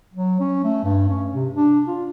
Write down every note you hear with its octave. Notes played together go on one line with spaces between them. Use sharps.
F#3
C#4
A3
G2
C#4
C3
D4
F4